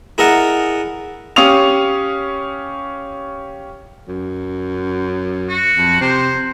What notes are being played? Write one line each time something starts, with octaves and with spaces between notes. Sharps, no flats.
E4 G#4 A#4 D#5 F#5 A5
C#4 G4 F5 C#6 D#6 F7
F#2
F#4
F2
C3 C5